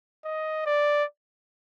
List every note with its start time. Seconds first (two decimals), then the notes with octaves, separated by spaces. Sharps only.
0.25 D#5
0.66 D5